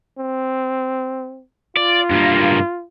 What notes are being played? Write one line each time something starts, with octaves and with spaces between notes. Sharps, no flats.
C4
F4 D5
G2 A#3